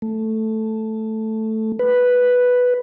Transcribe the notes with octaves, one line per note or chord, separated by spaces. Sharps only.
A3
B4